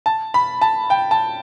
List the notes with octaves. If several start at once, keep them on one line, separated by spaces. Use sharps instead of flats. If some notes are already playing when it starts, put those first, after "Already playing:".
A5
B5
A5
G5
A5